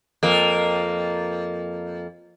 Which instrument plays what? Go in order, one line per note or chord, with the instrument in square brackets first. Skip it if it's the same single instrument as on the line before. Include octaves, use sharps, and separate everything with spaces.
[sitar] F2 A#3